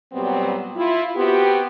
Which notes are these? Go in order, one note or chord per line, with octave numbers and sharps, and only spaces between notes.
A#2 F#3 G3 B3 C4
E4 F4
B3 C4 F#4 G4